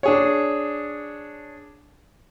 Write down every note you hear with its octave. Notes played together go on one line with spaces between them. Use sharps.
D4 G#4 C#5